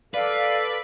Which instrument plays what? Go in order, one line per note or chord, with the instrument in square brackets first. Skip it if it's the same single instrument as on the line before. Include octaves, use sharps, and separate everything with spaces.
[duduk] A4 [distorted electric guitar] B4 [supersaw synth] D5 [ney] F5